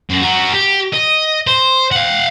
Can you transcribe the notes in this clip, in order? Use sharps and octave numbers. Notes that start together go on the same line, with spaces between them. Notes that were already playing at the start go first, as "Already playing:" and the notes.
F#2
F#4 A#4
G4
D#5
C5
F5 F#5